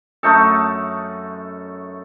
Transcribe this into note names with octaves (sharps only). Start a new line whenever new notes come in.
F#2 A3 D#4 A4